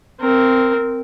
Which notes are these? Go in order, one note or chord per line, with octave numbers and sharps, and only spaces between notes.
C4 A#4